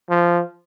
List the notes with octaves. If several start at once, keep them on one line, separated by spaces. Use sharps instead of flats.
F3